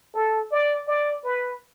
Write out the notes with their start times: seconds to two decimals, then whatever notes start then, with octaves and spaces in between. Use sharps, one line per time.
0.14 A4
0.51 D5
0.87 D5
1.24 B4